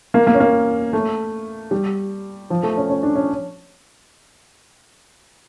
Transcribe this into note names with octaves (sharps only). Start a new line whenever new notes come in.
A#3
A#3
C#4
A#3
A3
G3
F3
A3
C#4
C#4
D4
C#4